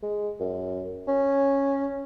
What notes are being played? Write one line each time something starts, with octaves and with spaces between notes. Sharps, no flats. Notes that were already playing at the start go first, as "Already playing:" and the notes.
G#3
F#2
C#4